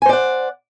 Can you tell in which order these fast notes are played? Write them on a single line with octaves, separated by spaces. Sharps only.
G#5 C5 D5 F#5